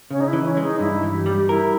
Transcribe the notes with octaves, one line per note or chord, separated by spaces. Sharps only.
C#3 C#4
D#4
E4
E3
C#4
G#3
D#4
G2 E4
E3
G4
G3
E4 A#4